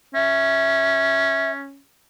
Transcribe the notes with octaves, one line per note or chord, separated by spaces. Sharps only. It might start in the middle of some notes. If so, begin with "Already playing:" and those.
C#4 E5